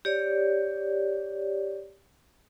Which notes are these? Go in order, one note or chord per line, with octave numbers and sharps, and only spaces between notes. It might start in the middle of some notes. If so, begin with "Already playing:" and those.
G4 C#5 D5